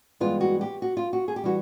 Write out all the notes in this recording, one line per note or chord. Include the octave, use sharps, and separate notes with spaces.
G2 E3 G#3 B3 F4
F#4
G4
F#4
F4
F#4
G#4
G4
E3 G3 F#4